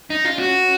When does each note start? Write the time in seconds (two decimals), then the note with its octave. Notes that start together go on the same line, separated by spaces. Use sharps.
0.10 C#4 D#4
0.25 F4
0.39 F#4